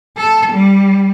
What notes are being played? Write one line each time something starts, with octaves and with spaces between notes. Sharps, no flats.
A4
G3